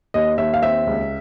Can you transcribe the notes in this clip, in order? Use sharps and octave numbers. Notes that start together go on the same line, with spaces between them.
D#2 D#5
D#2 E5
F5
C4 E5
C#2